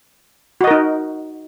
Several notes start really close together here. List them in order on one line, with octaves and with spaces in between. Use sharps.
F#4 D#5 A#4 D#4